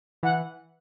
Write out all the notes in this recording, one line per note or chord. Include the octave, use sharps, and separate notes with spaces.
E3 F#5